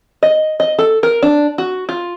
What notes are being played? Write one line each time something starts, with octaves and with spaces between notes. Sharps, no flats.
D#5
D#5
A4
A#4
D4
F#4
F4